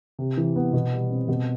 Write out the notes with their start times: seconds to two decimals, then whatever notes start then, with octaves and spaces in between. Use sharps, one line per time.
0.19 C3
0.37 E3
0.56 B3
0.73 B2
0.92 G3
1.11 C4
1.28 B2